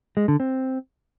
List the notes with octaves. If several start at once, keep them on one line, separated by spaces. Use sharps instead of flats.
G#3
D3
C4